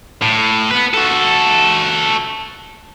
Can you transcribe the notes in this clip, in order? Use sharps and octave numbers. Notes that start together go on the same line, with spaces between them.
A2
B3 B4
F#4 A4